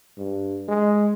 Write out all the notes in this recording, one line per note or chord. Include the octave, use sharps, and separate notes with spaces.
G2
G#3